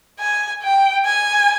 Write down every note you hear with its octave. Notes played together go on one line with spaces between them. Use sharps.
G#5
G5
G#5